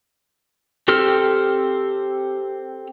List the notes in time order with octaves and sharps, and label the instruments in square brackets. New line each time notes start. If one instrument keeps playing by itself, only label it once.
[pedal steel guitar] C4 G4 A4 E6 F6